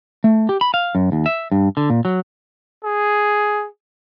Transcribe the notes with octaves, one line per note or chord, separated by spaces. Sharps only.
A3
G4
B5
F5
F#2
D#2
E5
G2
D3
A#2
F#3
G#4